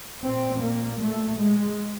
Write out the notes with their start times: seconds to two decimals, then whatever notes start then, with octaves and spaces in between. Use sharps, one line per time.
0.24 A#2 C4
0.62 A#3
1.00 A3
1.39 G#3